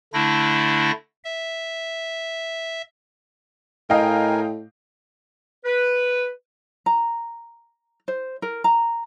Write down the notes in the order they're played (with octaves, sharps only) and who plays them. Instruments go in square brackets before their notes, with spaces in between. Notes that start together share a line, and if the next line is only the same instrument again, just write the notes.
[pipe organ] D3 A3 D4 E4 A#6
E5
[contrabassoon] A2 [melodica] A#4 G#5 [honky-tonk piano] D#5 F5 G5
[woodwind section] B4
[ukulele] A#5
C5
A#4
A#5